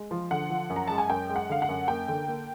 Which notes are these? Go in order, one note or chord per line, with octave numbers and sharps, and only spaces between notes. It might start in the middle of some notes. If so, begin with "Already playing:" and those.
Already playing: G#3
F3
D3 F#5
F3
F#2
A#5
G#3 A5
G#5
F#2 G5
G#3
F#5
D3 F5
F#5
F#2
A#3 G5
D3
A#3